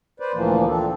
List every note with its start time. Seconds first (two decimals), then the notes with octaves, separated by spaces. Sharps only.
0.20 B4 C5 D5
0.34 D2 A#2 E3 F3 A#3
0.67 F3 C4 D4 A4